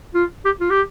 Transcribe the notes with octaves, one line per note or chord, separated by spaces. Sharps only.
F4
G4
F4
G4